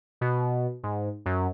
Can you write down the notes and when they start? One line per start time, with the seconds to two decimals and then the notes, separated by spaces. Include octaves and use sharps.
0.21 B2
0.83 G#2
1.26 F#2